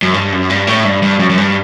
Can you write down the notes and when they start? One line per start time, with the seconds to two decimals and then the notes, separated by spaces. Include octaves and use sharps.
0.02 F#2
0.14 G2
0.32 F#2
0.50 G2
0.67 A2
0.85 G2
1.02 G2
1.20 F#2
1.30 F#2
1.38 G2